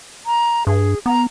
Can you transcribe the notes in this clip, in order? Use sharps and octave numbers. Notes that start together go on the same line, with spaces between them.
A#5
G2 G#4
B3 A#5